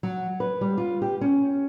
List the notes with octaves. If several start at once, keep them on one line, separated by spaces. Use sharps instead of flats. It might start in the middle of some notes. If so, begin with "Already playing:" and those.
F#3
B4
G3
F4
G4
C#4